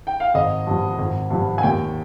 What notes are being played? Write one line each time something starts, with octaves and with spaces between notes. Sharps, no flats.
G5
F5
G#1 D#5
G2 F3
G#1
G2 F3
G#5
D#2 G5